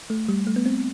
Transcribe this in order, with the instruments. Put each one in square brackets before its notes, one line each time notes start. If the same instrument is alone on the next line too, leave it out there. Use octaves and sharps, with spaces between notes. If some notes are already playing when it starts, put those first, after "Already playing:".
[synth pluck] A3
G3
A3
B3
C4